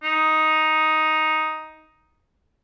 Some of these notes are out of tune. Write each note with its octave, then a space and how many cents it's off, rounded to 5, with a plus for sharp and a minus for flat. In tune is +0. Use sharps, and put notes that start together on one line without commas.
D#4 +5